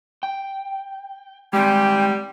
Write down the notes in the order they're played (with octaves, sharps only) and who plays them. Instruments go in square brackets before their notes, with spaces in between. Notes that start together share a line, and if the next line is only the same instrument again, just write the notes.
[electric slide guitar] G5
[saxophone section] G3 [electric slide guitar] G#3 C4 [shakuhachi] G5